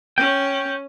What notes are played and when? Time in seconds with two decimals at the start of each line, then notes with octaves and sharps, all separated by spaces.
0.18 C#4 G5